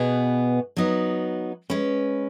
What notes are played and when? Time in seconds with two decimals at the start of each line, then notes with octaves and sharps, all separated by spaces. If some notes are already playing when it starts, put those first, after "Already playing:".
Already playing: B2 B3 G#4
0.77 F#3 B3 D#4 B4
1.70 G#3 C#4 B4